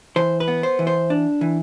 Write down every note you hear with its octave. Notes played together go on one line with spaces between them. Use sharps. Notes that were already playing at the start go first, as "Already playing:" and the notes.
E3 C5
B4
B3
C5
E3
C5
D4
E3